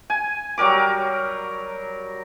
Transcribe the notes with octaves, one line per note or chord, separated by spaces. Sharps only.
G#5
F#3 G3 A#4 D6